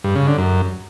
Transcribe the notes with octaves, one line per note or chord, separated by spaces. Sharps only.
G2
C#3
D3
F#2